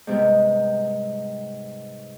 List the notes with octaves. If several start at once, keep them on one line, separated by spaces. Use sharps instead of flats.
G#2 C3 G3 B3